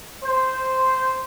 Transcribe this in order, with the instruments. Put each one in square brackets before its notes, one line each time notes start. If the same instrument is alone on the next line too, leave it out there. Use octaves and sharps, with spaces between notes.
[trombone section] C5